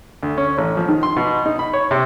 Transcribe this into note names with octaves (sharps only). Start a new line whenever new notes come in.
D2
C#4
A1
F3
D#3
C6
B2
D#4
B5
C#5
C3